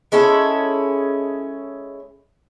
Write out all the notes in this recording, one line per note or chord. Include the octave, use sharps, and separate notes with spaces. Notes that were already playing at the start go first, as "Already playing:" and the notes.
G#3 C#4 E4 A4